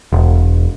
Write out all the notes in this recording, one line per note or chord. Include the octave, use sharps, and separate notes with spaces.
E1